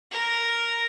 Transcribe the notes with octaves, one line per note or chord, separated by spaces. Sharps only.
A#4